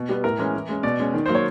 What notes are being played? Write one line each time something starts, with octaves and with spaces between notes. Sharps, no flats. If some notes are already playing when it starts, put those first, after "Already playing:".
Already playing: B2
G3 B3
A2 A#4
E3 G#3 C#4
E3
G#3 C#4
B2 D5
G#3 C#4
D#3
F#3 A#3 C5
C#5